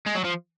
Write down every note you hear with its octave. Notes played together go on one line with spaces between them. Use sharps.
G#3
F#3
F3